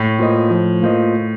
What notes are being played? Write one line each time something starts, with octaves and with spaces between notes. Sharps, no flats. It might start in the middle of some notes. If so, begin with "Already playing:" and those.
Already playing: A2
A#3 F4 C5 D#5
F3
A#3 F4 C5 D#5